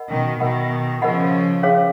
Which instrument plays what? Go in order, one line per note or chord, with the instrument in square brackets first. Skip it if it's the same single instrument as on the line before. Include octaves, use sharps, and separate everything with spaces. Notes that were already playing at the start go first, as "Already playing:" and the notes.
Already playing: [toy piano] A#4 D#5 F#5 B5
[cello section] B2 D#3
[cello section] B2 D#3 [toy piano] A#4 D#5 F#5 B5
[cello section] C#3 F3 [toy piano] A#4 D#5 F#5 B5
[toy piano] C#4 G#4 C#5 F5